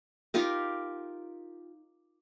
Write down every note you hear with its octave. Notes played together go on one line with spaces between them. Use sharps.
D#4 F4 G4 A#4